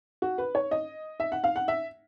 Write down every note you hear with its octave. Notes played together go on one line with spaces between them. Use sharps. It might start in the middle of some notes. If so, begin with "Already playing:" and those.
F#4
B4
C#5
D#5
E5
F#5
F5
F#5
E5